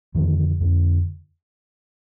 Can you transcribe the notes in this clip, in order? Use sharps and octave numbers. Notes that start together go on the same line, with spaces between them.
F2 D3 D#3
F2 D3